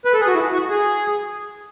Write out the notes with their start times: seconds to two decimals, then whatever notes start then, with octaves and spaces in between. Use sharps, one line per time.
0.05 B4
0.14 A4
0.21 G#4
0.27 F#4
0.34 E4
0.53 F#4
0.70 G#4